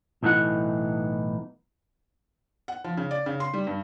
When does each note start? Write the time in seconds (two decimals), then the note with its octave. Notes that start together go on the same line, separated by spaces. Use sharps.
0.23 B1 A2 E3 D#4 F#5
2.68 F#5
2.84 F3
2.97 C#3
3.11 D5
3.26 C#3
3.40 C6
3.53 G3
3.67 G2